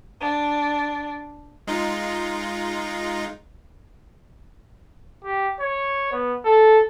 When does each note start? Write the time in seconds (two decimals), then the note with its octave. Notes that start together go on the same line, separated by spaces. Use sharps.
0.20 D4
1.67 G#3 D#4 F4
5.24 G4
5.60 C#5
6.12 B3
6.45 A4